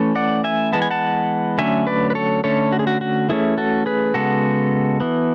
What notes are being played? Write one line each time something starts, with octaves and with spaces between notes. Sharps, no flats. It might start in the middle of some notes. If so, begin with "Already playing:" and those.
Already playing: E3 A3 C#4
D5 F#5
E5 G#5
E3 G#3 B3 A5
G#5
F#5 A5
D3 F#3 A3 C#4 E5 G#5
B4 D5
B4
A4 C#5
D3 A3 C#4 A4 C#5
F#4
G#4
F#4
F#4
E3 A3 C#4 E4 G#4
F#4 A4
G#4 B4
C#3 G#3 B3 F#4 A4
E3 B3